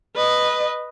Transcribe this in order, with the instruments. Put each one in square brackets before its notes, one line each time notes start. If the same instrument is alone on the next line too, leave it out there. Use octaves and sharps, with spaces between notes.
[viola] B4 D#5